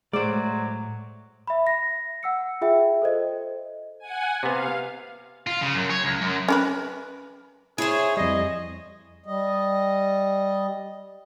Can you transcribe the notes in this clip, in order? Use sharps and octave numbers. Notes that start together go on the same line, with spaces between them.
A2 F#3 G#3 C5 D5
E5 B5
A#6
F#5 E6 C#7
F4 G#4 E5 G5
A4 C5 D#5
F#5 G#5
C3 B3 F5
F4
C#3
F#2
C#5
C#2
F#2
C#4 A#4 B4
E4 G#4 C5 C#5
F2 G3 D#5
G3 D#5